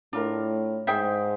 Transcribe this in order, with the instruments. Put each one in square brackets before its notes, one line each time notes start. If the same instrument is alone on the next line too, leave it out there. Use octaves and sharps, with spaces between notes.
[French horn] A2 [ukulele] D4 F4 A#4
[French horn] G#2 [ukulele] G#4 C5 E5 G5